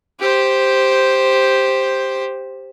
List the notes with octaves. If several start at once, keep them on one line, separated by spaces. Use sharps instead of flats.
G4 C5